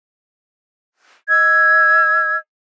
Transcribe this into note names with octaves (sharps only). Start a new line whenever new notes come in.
D#5 E6 G#6